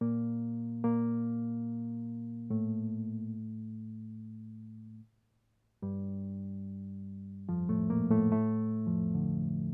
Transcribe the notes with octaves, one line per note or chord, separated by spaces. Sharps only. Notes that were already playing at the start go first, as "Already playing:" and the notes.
A#2 A#3
A#2 A#3
A2 A3
G2 G3
F2 F3
A2 A3
A#2 A#3
A2 A3
A2 A3
F2 F3
D2 D3